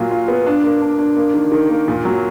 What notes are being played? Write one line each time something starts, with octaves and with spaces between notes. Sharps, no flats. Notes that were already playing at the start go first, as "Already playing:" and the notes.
Already playing: A#2 F#3 F4
F4
B3
D4
A#3
D4
D4
A#3
D#3
D#3
A#3
A#2
F#3